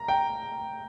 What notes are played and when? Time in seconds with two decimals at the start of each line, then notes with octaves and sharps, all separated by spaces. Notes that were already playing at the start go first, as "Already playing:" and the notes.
Already playing: A#5
0.08 G5